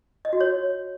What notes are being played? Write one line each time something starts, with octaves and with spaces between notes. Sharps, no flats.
D#5
F#4
C#5